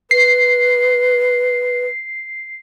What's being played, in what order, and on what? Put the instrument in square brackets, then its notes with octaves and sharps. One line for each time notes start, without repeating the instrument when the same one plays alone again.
[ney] B4 [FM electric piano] C7